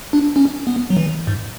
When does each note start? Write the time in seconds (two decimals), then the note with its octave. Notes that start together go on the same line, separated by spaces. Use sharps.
0.13 D4
0.36 C#4
0.67 B3
0.90 F#3
0.97 E3
1.27 G#2